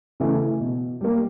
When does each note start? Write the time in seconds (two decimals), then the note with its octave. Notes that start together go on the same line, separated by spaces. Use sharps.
0.20 C#3 E3 A3
0.60 B2
1.01 G3 A#3